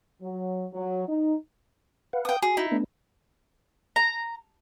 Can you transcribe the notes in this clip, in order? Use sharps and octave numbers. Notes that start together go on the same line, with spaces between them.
F#3
F#3
D#4
B4 F5 F#5
G5 D#6
F#4 G#4
D#4 E4
A3 B3 D4
A#5